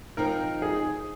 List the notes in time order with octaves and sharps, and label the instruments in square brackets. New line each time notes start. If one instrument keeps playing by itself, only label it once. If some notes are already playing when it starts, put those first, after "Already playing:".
[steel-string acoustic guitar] F3 C4 D#4 [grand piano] A#4
[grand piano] G#4